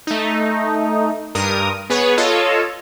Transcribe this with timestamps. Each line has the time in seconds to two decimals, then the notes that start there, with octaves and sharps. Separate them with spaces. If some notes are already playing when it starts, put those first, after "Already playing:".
0.07 A3 D#4
1.35 G2 A#4 D#6
1.90 B3 G#4 B4 C#5
2.18 F4 A4 C#5 D#5